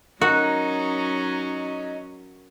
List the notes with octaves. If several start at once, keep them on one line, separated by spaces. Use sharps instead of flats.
F#3 C#4 D#4 F#4 A#4 F#5